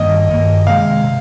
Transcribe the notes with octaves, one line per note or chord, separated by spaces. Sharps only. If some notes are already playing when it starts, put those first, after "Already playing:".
Already playing: G2 D#3 A#3 D#5
G2 D#3 A#3
C3 D#3 G#3 F5
C3